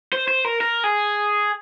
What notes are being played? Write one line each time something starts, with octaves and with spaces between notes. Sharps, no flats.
C5
C5
A#4
A#4
G#4